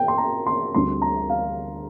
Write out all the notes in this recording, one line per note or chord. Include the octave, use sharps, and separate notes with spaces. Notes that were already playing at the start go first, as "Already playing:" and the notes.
Already playing: G5
C6
A#5
C6
D2 D3 G3 C4 C6
A#5
F5